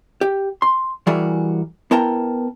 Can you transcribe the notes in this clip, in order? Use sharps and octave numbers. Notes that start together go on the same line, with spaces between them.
G4
C6
E3 G3 F#4 G#4 A#4
B3 E4 A#4 G5 A5 A#5